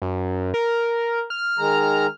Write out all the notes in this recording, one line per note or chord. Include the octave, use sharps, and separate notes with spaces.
F#2
A#4
F6
D#3 G#3 A#5